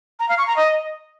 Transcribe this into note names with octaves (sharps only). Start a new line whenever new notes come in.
A#5
F5
C#6
A#5
D#5